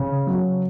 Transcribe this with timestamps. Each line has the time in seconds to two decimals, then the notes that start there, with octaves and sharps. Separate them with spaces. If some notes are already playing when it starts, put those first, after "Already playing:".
Already playing: C#3
0.27 F#3